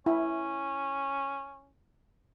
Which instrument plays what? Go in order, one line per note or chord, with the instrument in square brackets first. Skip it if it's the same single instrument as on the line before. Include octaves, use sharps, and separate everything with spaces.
[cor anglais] C#4 [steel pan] E4